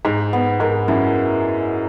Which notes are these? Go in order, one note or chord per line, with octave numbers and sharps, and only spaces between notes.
G#2 D#4
B3
G#2 A#4
F#2 E4